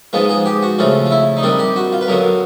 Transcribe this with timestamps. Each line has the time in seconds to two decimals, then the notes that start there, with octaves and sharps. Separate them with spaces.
0.13 G#2 F3 G#3 B3 F4
0.29 G#4
0.45 G4
0.62 F#4
0.79 C#3 F3 A3 C4 F4
1.06 F4
1.11 E4
1.37 D#4
1.43 C3 D#3 G3 C4 D4
1.59 G4
1.76 F#4
1.92 F4
2.01 B4
2.08 F#2 D3 F#3 B3 A#4